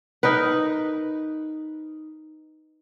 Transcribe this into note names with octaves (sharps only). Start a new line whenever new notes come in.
D#4 A#4 B4